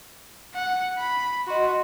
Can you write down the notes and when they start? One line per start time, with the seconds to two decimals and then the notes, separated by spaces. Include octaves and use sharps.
0.55 F#5
0.98 B5
1.48 F#4 D#5 C6